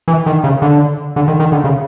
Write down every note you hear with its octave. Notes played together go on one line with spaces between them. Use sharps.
E3
D#3
C#3
D3
D3
D#3
D#3
D3
C#3